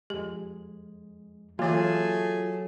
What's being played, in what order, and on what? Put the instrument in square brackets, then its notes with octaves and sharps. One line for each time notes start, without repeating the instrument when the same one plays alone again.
[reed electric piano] F2 G#3 [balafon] G4
[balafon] E3 A#3 [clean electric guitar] F#3 [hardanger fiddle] A3 G#4 [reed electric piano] F4